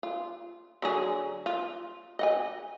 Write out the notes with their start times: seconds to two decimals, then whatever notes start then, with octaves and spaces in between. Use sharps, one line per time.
0.03 F4
0.82 D3 F#3 G#4
1.46 F4
2.19 D#5 F#5 G#5